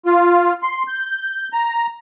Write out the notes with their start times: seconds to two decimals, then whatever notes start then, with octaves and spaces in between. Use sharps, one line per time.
0.06 F4
0.63 C6
0.88 G6
1.53 A#5